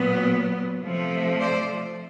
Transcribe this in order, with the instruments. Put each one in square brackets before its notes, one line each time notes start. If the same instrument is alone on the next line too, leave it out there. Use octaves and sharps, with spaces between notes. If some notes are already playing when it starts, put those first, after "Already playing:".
Already playing: [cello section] A#2 F#3 B3
C3 F3 A3
C5 D5